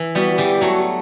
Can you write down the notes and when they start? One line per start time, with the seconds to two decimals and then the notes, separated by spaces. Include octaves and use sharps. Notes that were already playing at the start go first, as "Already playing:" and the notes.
Already playing: E3
0.15 G3 B3 F#4
0.31 F#4
0.38 E3 G3 G4
0.61 F#3 A3 F#4